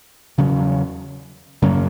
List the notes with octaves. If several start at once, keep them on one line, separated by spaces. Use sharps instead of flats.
E2 C#3 F#3
F#2 C#3 F#3 A#3